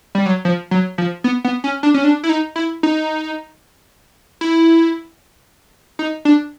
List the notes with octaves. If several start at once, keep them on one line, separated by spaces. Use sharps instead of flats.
G3
F#3
F3
F#3
F3
B3
B3
C#4
D4
C#4
D4
E4
D#4
E4
D#4
E4
D#4
D4